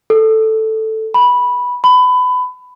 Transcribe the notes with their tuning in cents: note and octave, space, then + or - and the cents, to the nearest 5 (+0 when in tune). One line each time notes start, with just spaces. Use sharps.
A4 +0
B5 -10
B5 +25